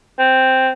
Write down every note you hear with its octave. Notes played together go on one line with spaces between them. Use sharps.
C4